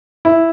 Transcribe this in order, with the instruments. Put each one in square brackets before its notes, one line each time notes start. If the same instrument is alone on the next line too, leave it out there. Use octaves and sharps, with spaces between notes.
[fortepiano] E4